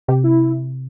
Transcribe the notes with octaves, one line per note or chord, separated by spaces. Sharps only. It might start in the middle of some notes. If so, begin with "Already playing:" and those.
C3 G4
E4